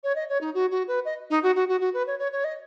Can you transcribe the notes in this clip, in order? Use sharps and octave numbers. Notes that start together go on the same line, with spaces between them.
C#5
D#5
C#5
D#4
F#4
F#4
B4
D#5
D#4
F#4
F#4
F#4
F#4
B4
C#5
C#5
C#5
D#5